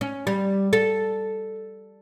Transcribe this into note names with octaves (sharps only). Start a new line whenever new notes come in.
C#4
G3
A4